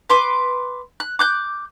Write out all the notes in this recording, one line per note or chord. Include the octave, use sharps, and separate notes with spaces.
B4 C6 D6
F#6
D6 F#6 G6